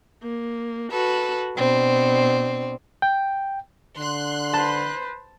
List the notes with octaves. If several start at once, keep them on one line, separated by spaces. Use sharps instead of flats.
A#3
F#4 A4 B4
B2 C4 D4
G5
D3 C6 F#6
B4 C5 A5